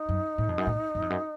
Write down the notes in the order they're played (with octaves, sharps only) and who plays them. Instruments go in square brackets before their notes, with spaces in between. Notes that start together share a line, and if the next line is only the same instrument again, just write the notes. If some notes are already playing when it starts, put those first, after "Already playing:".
Already playing: [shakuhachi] D#4
[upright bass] F#2
A2
F2
F#2
A2
F#2
F2
F#2